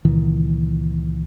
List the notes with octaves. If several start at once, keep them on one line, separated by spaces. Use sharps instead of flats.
C#2 A#2 D#3 E3